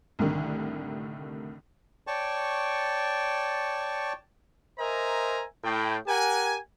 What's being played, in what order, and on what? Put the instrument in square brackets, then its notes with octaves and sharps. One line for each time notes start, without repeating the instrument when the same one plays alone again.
[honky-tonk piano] C2 A2 D3 D#3
[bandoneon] C#5 D5 G5 A5 C#6
[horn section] A#4 C5 D#5 E5 G#5 A#5
A2 G5
G4 A#4 F#5 G#5